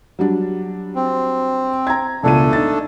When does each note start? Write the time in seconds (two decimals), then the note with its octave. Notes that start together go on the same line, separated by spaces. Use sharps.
0.19 F#3 G3 D4
0.95 C4
1.87 A#5 G#6
2.23 E1 C#2 A3 D4 A4 D#7
2.53 D#4 A6